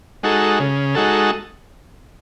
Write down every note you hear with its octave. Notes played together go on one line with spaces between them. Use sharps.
G#3 D#4 F#4 A4
C#3
G#3 D#4 F#4 A4